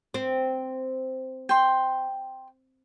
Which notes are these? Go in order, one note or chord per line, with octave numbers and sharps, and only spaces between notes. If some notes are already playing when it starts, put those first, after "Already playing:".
C4
G5 C6